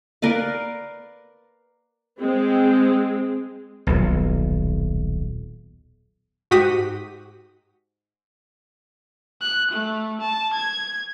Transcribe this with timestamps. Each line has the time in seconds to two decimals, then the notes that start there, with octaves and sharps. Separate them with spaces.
0.22 A#4 B4 D5 F5
2.20 G#3 C4
3.87 D#1 B1
6.51 G#2 F#4 G4 D#6 B6 D#7
9.41 F#6
9.71 A3
10.21 A5
10.53 G#6